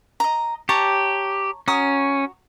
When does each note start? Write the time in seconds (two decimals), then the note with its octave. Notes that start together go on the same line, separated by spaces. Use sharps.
0.20 D#5 A#5
0.69 G4 C#5 A5 A#5
1.68 C#4 F#4 A#5 D#6